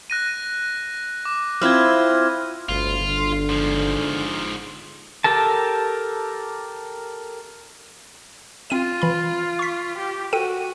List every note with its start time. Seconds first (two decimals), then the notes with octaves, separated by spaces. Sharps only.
0.10 F#6 A#6 D#7
1.25 D6
1.62 C4 E4 F4 F6 G#6
2.69 G1 D2 F4
3.01 D3
3.49 G#2 F3
5.24 G4 A4 A#4 A5
8.70 C4 F4 D#7
9.02 E3 B5
9.59 C#6 B6
9.98 G4
10.33 F#4 A4 G5 D#7